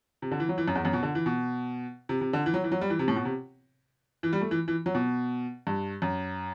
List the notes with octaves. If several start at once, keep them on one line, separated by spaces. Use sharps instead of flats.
C3
D3
E3
F#3
E3
F#2
E2
F#2
B2
D3
E3
B2
C3
C3
D3
E3
F#3
E3
F#3
G3
E3
C3
A2
B2
C3
E3
G3
A3
E3
E3
F#3
B2
G2
F#2